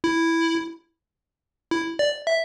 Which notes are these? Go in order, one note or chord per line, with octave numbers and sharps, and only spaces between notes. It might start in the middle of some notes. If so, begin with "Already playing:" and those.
E4
E4
D5
E5